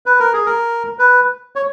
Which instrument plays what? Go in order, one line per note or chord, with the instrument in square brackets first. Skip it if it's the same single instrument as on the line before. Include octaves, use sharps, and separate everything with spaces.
[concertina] B4
A#4
G#4
A#4
B4
C#5